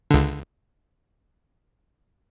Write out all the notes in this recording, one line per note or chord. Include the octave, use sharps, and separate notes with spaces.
C#2 D3